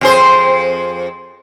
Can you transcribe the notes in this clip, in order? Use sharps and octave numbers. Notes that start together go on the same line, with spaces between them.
F2 G#4 C5